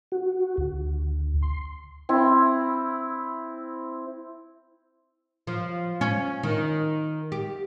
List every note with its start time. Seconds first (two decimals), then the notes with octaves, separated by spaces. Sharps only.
0.12 F#4
0.57 D2
1.42 C6
2.09 C4 E4
5.47 F3
6.01 C#4
6.43 D#3
7.32 G4